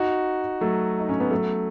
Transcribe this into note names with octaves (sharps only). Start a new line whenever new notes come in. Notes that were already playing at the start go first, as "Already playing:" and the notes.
Already playing: D#4 F#4
F#3 A3
D#4
C#4
B3
F#3 A3